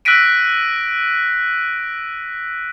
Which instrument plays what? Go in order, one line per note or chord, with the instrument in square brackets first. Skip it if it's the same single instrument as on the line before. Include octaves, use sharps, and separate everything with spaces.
[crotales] E6 F#6 A#6 B6 D7 D#7